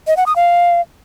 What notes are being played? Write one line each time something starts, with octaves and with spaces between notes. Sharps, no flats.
D#5
F#5
D#6
F5